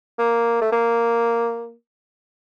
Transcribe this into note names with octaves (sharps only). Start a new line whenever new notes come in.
A#3
A3
A#3